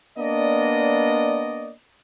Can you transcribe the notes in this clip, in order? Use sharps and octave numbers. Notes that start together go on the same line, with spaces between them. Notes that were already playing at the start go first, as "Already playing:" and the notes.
A#3 B3 D4 D5 D#5